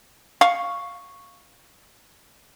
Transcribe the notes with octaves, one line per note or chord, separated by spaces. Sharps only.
F5 C#6